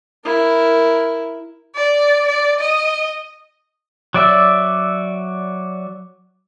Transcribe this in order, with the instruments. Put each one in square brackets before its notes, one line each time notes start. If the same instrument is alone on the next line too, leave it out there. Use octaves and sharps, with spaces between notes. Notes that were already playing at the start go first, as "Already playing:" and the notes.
[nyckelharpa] E4 A#4
[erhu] D5
D5
D#5
[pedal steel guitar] F#3 D5 E5